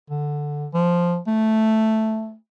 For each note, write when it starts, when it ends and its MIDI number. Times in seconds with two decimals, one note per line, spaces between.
0.10 0.67 50
0.74 1.18 53
1.27 2.35 57